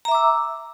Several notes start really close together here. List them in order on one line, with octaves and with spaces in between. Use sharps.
A#5 E5 D6 E6